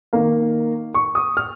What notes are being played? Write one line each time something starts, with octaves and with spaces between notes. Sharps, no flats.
D#3 A#3 F5
C#6
D#6
F6